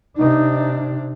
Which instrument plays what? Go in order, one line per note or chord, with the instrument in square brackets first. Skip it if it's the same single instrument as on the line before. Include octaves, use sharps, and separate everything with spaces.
[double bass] C3 D4 [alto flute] D#4